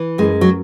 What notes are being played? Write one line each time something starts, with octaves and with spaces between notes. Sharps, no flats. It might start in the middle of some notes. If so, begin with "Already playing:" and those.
Already playing: E3
F#2 G#3
F#3